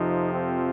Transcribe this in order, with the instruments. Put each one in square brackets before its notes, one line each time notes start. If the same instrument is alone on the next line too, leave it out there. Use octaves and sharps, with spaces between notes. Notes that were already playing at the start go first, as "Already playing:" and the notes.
Already playing: [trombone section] F2 C3 F3 D#4
C4